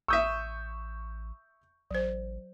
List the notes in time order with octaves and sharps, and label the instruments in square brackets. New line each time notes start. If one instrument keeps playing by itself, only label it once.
[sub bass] A1 [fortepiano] E5 D#6 E6 [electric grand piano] C#6 G6
[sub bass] A1 [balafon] F#3 C5